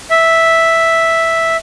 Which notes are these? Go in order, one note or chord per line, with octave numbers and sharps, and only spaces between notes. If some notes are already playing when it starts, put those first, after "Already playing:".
E5